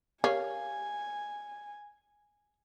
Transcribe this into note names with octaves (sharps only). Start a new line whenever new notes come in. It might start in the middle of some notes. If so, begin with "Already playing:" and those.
C#4 G4 A#4 C#5 F5 G#5